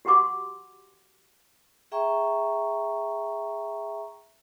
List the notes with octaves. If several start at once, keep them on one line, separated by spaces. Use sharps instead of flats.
F#4 G4 F#5 C6 D6
G#4 E5 G5 A#5 C#6